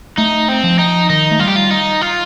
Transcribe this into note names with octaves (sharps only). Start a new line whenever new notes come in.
A3 D#4
C4
F3
D#4
D#3 D#4
A3
G3 F4
G4
F4
D#4
F4